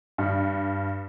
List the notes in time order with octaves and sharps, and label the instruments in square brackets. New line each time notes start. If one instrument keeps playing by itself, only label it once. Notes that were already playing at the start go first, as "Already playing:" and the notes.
[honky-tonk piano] G2